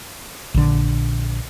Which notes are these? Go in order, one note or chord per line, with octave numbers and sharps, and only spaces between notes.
A#1 D3